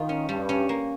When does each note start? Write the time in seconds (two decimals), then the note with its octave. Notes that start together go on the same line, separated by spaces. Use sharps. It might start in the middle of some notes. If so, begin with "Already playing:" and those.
Already playing: D#3 F4
0.09 C#4
0.29 G2 G3
0.49 C#4
0.69 A#3